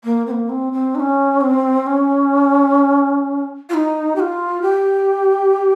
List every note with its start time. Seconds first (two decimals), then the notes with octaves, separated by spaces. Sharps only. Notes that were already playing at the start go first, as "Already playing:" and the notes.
0.04 A#3
0.27 C4
0.31 A#3
0.49 C4
0.73 C4
0.95 D#4
1.00 C#4
1.41 C4
1.86 C#4
3.69 F4
3.74 D#4
4.16 G4
4.20 F4
4.62 G4